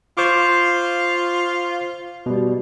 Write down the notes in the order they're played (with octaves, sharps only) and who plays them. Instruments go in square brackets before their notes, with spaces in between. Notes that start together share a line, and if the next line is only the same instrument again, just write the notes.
[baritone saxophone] F4 [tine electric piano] C5 C#6 D6
[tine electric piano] B2 G3